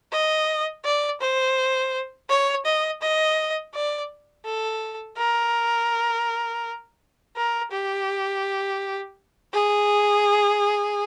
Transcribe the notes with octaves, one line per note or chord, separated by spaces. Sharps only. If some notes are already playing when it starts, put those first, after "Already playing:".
D#5
D5
C5
C#5
D#5
D#5
D5
A4
A#4
A#4
G4
G#4